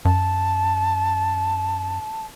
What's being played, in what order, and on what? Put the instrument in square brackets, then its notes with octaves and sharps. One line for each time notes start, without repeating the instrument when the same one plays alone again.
[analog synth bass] F#2 [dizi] A5